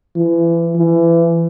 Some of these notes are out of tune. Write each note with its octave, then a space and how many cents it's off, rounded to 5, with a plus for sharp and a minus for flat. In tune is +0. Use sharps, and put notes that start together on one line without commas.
E3 +30
E3 +25